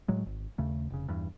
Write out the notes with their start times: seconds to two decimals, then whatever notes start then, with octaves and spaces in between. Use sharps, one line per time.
0.08 A2 F#3 G#3
0.26 G#1
0.58 D#2 C#3 A3
0.90 F1 C#3
1.08 E2 G2